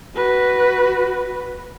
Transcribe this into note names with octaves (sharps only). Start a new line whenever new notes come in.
F#4 B4